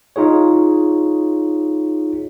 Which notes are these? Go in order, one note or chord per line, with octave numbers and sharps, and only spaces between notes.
D#4 F4 G#4 C#5